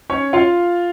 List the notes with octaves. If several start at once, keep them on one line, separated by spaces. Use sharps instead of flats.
C#4 C#5
F4 F5